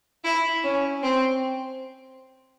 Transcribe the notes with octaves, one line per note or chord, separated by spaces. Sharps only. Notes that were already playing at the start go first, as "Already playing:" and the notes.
E4
C#4
C4